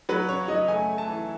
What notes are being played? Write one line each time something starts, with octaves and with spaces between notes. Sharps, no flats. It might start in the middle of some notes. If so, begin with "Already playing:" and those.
F#3 B4
C#3 C#5
F#3 D#5
A3 G#5
A3
A5
E3